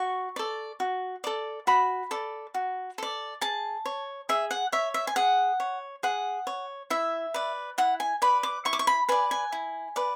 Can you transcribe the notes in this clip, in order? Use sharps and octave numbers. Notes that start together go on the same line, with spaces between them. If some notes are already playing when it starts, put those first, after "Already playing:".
Already playing: F#4 C#6
A4 D5
F#4
A4 D5
F#4 B5
A4 D5
F#4
A4 D5
G#4 A5
C#5
G#4 E5
F#5
C#5 E5
E5
G#5
G#4 F#5
C#5
G#4 F#5
C#5
E4 E5
B4 D5
E4 F#5
G#5
B4 D5 B5
D6
E4 C#6
D6
C#6
B5
B4 D5 G#5
G#5
E4
B4 D5